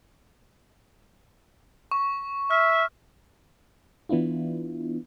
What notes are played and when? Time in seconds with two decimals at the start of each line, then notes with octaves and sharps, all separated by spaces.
1.91 C#6
2.51 E5 F6
4.09 E3 B3 D4 E4 F4